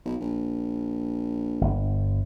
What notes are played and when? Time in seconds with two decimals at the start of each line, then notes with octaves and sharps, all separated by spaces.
0.05 B1
0.20 A#1
1.61 G1